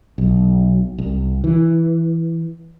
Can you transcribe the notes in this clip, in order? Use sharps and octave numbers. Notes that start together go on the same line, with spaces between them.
B1
C2
E3